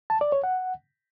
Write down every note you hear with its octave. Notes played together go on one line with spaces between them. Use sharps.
A5
D5
C#5
F#5